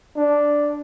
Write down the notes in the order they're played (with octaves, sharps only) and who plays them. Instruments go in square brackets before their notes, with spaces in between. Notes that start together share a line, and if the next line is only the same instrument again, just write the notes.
[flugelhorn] D4